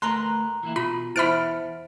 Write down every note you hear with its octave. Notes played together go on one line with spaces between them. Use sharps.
D2 A3 A#4 B4 A#5 C6 F#6
E3 A#3 E4
B2 F4 B5
E2 B3 E4 C5 E5 B5 F6 D7